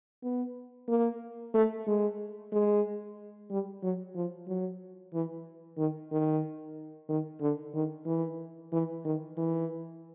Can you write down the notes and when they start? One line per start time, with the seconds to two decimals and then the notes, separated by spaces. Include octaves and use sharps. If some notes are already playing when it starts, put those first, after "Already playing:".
0.23 B3
0.88 A#3
1.54 A3
1.87 G#3
2.53 G#3
3.50 G3
3.82 F#3
4.15 F3
4.48 F#3
5.13 E3
5.78 D#3
6.11 D#3
7.09 D#3
7.41 D3
7.74 D#3
8.06 E3
8.72 E3
9.05 D#3
9.37 E3